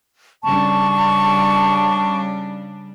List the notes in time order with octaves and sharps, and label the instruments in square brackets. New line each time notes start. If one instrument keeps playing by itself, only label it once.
[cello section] C#3 G3 D4 [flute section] A5 C#6